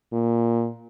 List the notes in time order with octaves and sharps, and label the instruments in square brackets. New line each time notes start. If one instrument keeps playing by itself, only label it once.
[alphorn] A#2